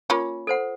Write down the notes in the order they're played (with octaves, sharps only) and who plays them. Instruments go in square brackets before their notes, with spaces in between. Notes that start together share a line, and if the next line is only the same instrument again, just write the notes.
[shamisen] A#3 C#4 [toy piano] F4
[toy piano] A4 C5 F#5